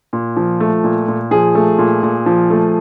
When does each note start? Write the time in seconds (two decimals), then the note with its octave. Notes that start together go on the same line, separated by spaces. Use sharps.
0.13 A#2
0.36 F3
0.60 A3
0.84 A#2
1.08 A#2
1.31 F3 G#4
1.55 A3
1.78 A#2
2.03 A#2
2.26 F3
2.50 A3